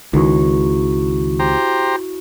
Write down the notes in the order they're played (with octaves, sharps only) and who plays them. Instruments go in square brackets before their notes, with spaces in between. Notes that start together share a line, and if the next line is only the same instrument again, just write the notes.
[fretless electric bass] C#2 [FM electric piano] D#3 [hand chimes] E4 F#4 C#6
[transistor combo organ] G4 C5 A#5